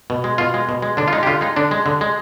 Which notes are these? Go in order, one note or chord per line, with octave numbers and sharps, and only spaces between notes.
B2
G#3
B2 F4
G#3
B2
G#3
D3 D4
F4
G#3 D#4
G4
D3 F4
G#3 D#4
D3 D4
G#3
D3
G#3